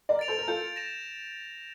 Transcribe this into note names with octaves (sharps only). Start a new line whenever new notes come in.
A#4 D5
A6 D7 F7
A4 C5
A#4
F4 A4 G6
A#6 E7